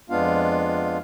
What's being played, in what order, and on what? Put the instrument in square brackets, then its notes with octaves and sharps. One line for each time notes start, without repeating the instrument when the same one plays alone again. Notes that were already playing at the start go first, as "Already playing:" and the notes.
[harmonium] F2 G#3 B3 D4 F4 F5